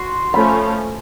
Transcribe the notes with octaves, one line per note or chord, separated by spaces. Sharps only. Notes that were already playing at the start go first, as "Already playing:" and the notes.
Already playing: F#4 C6
F3 A3 C#4 F4 B5